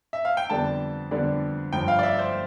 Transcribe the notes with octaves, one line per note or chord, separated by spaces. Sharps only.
E5
F5
G5
F2 D3 G3 B3 D4 A5
F2 D3 G3 B3 D4
G1 G2 F3 G5
F5
D5
E5
C5